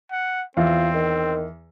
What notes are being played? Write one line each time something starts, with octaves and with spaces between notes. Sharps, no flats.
F#5
E2 C4 F4
D#3